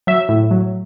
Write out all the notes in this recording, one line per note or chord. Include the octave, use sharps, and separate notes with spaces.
F#3 E5
A2
F#3